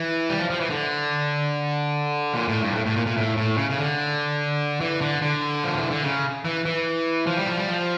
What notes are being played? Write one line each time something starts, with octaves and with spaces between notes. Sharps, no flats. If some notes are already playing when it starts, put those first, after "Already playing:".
Already playing: E3
G3
F3
F3
E3
D3
A#2
A2
G2
A#2
A2
A2
A#2
A#2
A2
A2
C#3
C#3
D3
E3
D3
D3
F3
E3
D3
C#3
E3
E3
F3
G3
F3
G3
F3